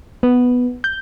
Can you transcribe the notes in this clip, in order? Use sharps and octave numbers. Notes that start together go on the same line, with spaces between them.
B3
G6